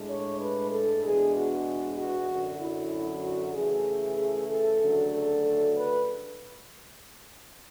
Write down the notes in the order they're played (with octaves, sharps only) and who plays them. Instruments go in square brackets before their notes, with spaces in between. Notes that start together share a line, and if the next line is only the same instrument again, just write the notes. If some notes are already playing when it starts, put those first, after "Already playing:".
Already playing: [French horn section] A2 G#3 D4
C#5
B4
A4
E2 B2 G#3 D4 G#4
F#4
F#4
F#2 D3 F#3
E4
F#4
C#3 E3 A3 G#4
G#4
A4
D2 C#3 F#3 A3 D4
A4
A4
B4